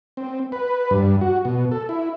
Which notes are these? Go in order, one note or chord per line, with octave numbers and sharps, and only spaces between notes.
C4
B4
G2
F#4
B2
A4
E4